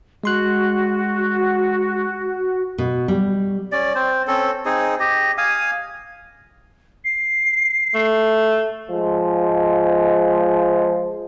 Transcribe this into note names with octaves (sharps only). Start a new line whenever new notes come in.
G#3 F#4 C6 F#6
B2
G3
C#4 D5
C4 C5
C4 C#4 A4
C4 D#4 G#4
G4 D#5
F5 G#5 D#6
C7
A3
F3 G#3